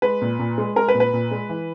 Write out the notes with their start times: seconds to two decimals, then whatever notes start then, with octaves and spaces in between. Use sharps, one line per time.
0.02 G#3 B4
0.21 A#2
0.39 A#2
0.58 G#3
0.76 G#3 A#4
0.88 B4
0.94 A#2
1.00 B4
1.13 A#2
1.31 G#3
1.49 E3